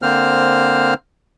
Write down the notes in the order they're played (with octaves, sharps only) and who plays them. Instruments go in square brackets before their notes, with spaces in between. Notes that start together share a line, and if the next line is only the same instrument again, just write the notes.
[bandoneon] D3 A#3 C4 C5 F6